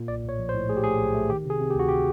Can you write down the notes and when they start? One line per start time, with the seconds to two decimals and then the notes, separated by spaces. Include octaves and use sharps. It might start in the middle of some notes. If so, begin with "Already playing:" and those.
Already playing: A#2
0.08 B1 D5
0.24 A2 C#5
0.39 F3
0.49 C5
0.54 A2
0.69 A3 G#4
0.77 G4
0.84 A3 G#4
1.00 B1
1.14 A3
1.30 D#3 G4
1.45 C3 G#4
1.60 C3
1.70 G4
1.75 D2 F#4
1.88 G4